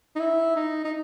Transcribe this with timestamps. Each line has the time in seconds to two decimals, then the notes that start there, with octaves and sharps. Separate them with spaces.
0.15 D#4
0.20 E4
0.56 D#4
0.84 D#4